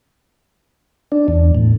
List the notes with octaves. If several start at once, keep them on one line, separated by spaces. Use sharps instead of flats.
D4
E2
A2